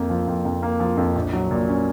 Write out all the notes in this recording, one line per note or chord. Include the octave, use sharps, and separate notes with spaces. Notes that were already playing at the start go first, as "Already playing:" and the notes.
Already playing: F2 A#3
F3
F2
F2
A#3
F3
F2
A#1
F#3
A#2
C#4